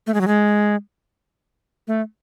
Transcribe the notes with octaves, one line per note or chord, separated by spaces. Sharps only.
A3
G#3
F#3
G#3
A3